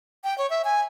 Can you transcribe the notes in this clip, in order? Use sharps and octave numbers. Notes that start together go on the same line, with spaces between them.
G5
C#5
E5
G#5